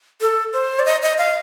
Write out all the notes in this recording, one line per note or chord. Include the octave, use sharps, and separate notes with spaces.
A4
C5
D5
D#5
D#5
F5